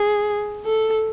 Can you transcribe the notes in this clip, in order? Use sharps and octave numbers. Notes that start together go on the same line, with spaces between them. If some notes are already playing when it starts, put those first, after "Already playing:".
Already playing: G#4
A4